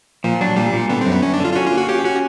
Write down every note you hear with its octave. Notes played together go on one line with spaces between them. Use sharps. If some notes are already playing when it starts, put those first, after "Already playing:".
A#2 F3
F#3 D4
A#2 G3
A#2
D3 B3
F#2 C4
B3
F#2 C#4
D4
D3 F4
F4
C#4 F#4
F4
A#3
F#4
C#4 G4
C#4 F#4